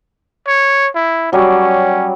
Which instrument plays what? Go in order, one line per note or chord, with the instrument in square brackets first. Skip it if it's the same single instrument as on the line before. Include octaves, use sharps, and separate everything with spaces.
[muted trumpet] C#5
E4
[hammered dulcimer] F#3 G3 D5 [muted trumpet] C#4